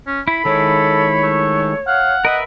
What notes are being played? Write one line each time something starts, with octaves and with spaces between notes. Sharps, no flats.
C#4
E4 B5
D#3 G#3 E4 A4 C#5
A3
F5 F#5
A#4 B4 D#5 E5